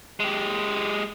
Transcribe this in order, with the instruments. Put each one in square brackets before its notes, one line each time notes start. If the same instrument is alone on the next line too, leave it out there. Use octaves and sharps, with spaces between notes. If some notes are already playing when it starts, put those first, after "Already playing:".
[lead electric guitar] G#3 G4